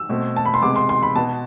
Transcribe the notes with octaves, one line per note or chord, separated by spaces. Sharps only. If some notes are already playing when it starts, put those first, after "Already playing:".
Already playing: E6
B2 A3 C4
A5
B5
C6
C3 G#3 B3 D6
C6
C6
B5
B2 B3 A5